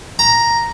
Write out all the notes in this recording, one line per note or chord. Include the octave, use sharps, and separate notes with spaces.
A#5